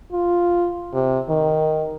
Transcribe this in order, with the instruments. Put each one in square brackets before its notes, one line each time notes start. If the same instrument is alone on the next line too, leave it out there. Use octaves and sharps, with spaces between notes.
[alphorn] F4
C3
D#3